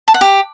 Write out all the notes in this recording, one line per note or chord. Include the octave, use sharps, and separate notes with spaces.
A5
F#5
G4